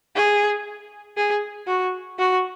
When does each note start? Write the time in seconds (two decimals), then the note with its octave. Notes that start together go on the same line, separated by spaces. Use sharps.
0.15 G#4
1.17 G#4
1.67 F#4
2.19 F#4